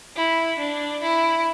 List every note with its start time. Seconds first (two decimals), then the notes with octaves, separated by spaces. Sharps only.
0.17 E4
0.60 D4
1.03 E4